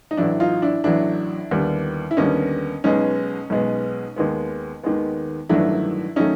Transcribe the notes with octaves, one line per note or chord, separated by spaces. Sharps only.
D#4
A1 A2 F#3 D4 E4
D#4 F4
D4 E4
A1 A2 F#3 D4 E4
D#2 D3 G3 B3
E4
D#2 D3 G3 B3 C#4 D#4
B1 B2 G#3 B3 C#4 D#4
B1 B2 G#3 B3
D#2 D#3 G#3 B3
D#2 D#3 G#3 B3
A1 G2 D#3 F#3 A3 D4 E4
D#3 F#3 A3 C#4 D#4